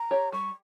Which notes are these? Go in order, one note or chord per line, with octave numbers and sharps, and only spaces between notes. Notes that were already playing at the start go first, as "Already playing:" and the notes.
Already playing: A#5
G4 C#5
G3 C#6